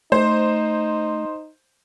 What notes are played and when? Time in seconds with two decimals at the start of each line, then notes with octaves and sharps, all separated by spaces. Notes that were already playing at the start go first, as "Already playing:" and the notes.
0.12 A3 D#4 C5